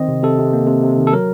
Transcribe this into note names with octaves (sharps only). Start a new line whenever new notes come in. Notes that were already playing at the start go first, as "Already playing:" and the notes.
Already playing: D#3 C4 D#5
C3
C3 A4
C3
A#3
C3
C3
D#3
A4
F#3 A#4